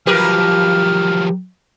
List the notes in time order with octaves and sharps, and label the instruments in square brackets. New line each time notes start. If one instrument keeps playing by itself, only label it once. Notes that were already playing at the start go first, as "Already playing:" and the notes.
[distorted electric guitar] F3 F#3 [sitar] G4 A#4 B4 [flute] F6